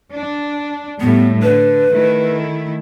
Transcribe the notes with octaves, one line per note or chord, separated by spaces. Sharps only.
D4
A2 G3 B3
D3 B4
D#3 A3 E4